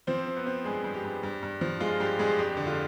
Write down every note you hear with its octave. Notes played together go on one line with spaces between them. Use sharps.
F3 C4 C5
C4
B3 B4
C4
G2 G#3 G#4
G2
G4
G2
G2
G2
F3
G#3 F4
G2 G4
G2 G#3 G#4
F2 G4
D3
F4